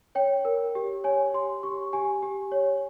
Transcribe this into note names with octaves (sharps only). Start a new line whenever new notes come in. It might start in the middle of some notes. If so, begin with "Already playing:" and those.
C#5 G5
A#4
G4
C#5 G#5
G4 C6
G4 C#6
G4 G#5
G4
C#5